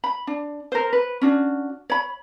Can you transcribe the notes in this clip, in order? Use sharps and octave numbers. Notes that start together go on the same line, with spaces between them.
B5
D4
A#4 C5
B4
C#4 D4 F#4
C#5 B5